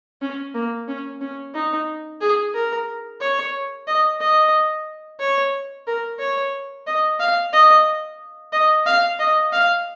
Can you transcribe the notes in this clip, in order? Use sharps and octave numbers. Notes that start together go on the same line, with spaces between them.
C#4
A#3
C#4
C#4
D#4
G#4
A#4
C#5
D#5
D#5
C#5
A#4
C#5
D#5
F5
D#5
D#5
F5
D#5
F5